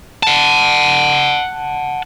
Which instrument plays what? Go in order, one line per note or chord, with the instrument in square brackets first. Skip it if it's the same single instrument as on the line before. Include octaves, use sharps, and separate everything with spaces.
[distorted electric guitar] F#5 A5